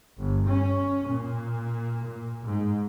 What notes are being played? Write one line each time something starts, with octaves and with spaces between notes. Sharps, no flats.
G1
C#4
A#2
A#2
G#2